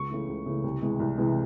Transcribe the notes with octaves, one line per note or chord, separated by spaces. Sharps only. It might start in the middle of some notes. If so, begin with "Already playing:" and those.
Already playing: C#2 C#6
C#3 E3 A3
C#2
C#3 E3 A3
C2
C3 E3 G#3
C2
C3 E3 G#3